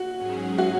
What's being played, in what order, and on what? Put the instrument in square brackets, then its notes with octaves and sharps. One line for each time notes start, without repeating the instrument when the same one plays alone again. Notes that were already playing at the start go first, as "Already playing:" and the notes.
Already playing: [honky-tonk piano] F#4
[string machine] G#2 F#3 C#4 G#4
[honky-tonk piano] F#4